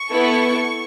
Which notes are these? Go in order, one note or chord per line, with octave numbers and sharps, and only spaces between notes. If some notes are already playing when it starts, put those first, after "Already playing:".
Already playing: C#6
B3 E4 A4